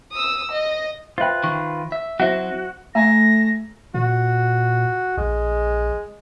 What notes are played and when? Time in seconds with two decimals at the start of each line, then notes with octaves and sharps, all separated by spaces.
0.12 D#6 E6
0.51 D#5
1.18 F4 B4 C5 E5 G5
1.44 D#3 C#6
1.92 E5
2.20 F#3 C4 E4 F#4 C5 E5 F#5
2.95 A3 E5 G#5 A#5 A#6
3.94 A#2 F#4
5.17 A#1 G#3